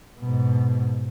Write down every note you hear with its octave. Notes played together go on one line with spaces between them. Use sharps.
G#2 B2